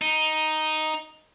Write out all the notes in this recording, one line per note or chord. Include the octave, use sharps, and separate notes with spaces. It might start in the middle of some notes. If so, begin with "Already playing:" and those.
D#4